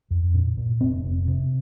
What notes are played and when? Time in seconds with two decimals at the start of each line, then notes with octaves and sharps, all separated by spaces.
0.11 F2
0.34 A#2
0.57 A#2
0.81 F1 C4
1.04 F1
1.28 C3